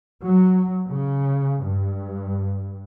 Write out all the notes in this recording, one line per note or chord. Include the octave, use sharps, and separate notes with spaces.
F#3
C#3
G2